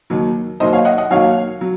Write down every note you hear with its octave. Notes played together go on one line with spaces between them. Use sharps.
D#2 D#3 F#3
D#2 D#3 F#3 C5 D#5
C#5 F5
D#5 F#5
D#5 F#5
D#2 D#3 F#3 C#5 F5
F#3